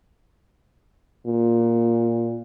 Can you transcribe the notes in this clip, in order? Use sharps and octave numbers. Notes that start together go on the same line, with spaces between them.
A#2